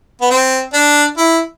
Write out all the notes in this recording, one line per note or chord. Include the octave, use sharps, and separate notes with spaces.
B3
C4
D4
E4